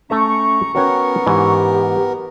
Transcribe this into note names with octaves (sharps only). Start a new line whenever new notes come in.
A3 C#4 A4 E5 A#5 C#6
B3 C#4 F#4 A#4 C#5 G5
G#2 E3 G4